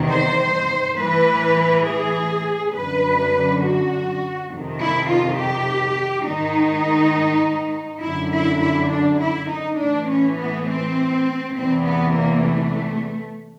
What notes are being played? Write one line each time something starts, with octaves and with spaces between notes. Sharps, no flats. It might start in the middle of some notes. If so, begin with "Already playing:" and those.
Already playing: E2 C3 D#3
C5
A2 E3 B4
G#4
F#2 D3 B4
F#4
F2 C3 D#3
E4
F4
G4
G#2 D#3 D#4
F#2 D3 E4
E4
E4
D4
E4
D#4
A2 E3 D4
C#4
B3
C4
E2 C3 E3 C4
B3
A#3
A3